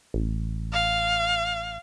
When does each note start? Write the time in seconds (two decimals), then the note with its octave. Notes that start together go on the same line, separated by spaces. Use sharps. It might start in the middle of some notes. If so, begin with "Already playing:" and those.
0.14 A1
0.73 F5